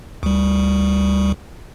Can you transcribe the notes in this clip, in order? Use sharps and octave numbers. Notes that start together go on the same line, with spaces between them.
D2 G3